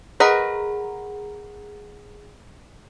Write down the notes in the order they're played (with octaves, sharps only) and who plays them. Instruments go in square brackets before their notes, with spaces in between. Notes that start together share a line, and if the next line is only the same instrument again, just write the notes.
[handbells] G#4 F#5 A#5 [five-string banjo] A#4 B4 D#5